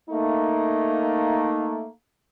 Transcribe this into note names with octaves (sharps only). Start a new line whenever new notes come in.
A3 A#3 D#4